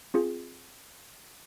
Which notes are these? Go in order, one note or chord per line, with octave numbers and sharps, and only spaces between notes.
C4 F4 G#4